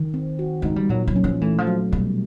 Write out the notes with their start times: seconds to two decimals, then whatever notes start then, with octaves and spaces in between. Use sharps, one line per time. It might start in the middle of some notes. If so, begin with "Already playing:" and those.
Already playing: D#3
0.14 C4
0.39 F#4
0.62 G#3 D#4
0.76 G3
0.89 A#2 F#3
1.08 F#3
1.16 C#4
1.24 F3
1.41 E3 A3
1.58 F3
1.67 F#3
1.92 B2 G3